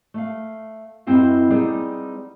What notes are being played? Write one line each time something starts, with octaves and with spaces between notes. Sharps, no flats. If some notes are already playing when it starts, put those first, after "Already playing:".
A3 F5
F#2 G3 C4 E4 D#5 F5
G3 B3 C4 D#4 G#4